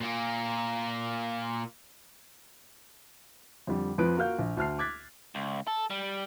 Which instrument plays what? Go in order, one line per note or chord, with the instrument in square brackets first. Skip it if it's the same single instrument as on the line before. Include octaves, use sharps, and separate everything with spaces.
[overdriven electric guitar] A#2 A#3
[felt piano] F2 D3 G3
F2 F3 B4 D7
A#3 F4 F#4 F5 F6 G6
A#1
D2 A5 F6 C7
D6 F#6 G#6 A6 B6
[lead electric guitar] C#2
A4
G3